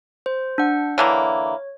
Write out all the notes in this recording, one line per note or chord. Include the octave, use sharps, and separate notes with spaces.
C5
D4 F#5
D3 E3 A#3 C#5